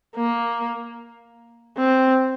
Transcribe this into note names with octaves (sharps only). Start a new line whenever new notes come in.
A#3
C4